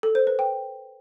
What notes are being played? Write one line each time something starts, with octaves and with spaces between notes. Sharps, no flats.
A4
C5
B4
G5